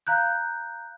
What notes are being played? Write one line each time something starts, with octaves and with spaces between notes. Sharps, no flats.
F5 A#5 F#6 G6